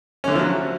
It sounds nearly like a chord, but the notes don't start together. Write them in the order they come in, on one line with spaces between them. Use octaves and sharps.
C#4 D3 A3 F3 F#3